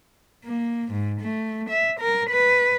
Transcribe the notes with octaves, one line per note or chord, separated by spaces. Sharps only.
A#3
G#2
A3
E5
A#4
B4